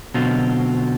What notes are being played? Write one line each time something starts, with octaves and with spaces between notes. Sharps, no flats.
B2 D3 F#3 C4 F4